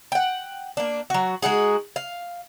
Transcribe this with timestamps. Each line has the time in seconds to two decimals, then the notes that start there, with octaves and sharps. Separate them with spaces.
0.12 F#5 G5
0.77 A#3 D4
1.10 F#3 F#4
1.42 G#3 D#4 F#4 G#4
1.96 F5